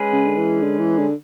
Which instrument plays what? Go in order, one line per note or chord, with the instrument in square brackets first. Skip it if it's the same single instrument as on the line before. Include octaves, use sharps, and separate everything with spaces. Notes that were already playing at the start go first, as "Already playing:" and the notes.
Already playing: [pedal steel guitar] G#3 C#4 G#4 B4
[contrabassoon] C#3
D3
E3
D3
E3
D3